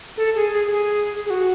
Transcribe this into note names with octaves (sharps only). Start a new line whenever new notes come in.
A4
G#4
G#4
G#4
G#4
F#4